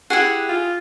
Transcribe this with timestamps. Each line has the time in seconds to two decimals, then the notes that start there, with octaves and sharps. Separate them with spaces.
0.10 E4 G4 G#4 F#5
0.49 F4